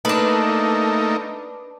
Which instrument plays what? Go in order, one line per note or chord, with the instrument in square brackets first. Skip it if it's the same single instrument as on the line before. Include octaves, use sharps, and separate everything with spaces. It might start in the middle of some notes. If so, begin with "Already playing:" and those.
[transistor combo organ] A3 A#3 D#4 [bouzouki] D4 B4